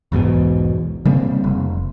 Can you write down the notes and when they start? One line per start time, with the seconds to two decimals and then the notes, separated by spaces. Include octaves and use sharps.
0.12 B1 E2 G#2 B2
1.05 C#3 G3 A#3 C4
1.44 F1